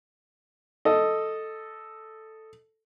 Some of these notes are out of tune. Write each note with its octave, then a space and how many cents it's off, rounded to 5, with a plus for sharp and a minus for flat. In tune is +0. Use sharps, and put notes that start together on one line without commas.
A4 +0 D#5 +0